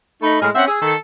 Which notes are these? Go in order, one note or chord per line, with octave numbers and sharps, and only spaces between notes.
A3 D#4 B5
A2 G#3 G#4 F6
C4 C#4 E5 F#5
G#4 E6
D#3 A4